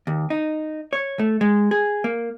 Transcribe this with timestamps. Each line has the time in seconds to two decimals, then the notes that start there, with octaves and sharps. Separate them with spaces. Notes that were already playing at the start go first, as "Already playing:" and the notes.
0.07 D#2
0.30 D#4
0.93 C#5
1.19 A3
1.41 G#3
1.71 G#4
2.04 A#3